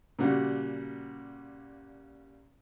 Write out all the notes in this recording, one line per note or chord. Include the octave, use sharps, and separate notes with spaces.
A#2 C#3 G3 F#4